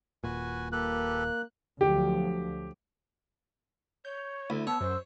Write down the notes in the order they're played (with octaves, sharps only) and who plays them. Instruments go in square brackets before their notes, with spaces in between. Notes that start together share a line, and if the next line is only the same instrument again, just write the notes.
[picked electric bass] D#1 A#2 [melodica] F#4 B4 G#5
[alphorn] A#3 [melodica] G4 A4 B4 [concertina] F#6
[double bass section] D2 F3 F#3 [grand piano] G4
[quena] C#5 [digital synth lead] G6
[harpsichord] D2 [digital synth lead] E4
[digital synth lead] B3 [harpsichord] C#5 [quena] A5 [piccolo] E6
[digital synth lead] F#2 [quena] C5